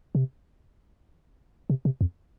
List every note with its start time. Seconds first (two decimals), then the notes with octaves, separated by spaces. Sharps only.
0.15 C3
1.70 C3
1.85 C3
2.01 F2